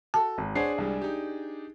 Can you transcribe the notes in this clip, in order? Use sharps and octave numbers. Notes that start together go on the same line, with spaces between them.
F#4 A4 A5
G#1
D4 G#4 C5 C#5 F#5 C7
C2 G3 G#3
D#4 G4